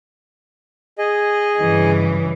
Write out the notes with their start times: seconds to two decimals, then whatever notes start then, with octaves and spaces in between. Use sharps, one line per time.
0.98 G#4 D#5
1.59 G2 C#3 E3